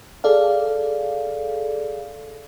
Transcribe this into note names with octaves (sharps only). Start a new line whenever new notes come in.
G#4 A4 D5 F5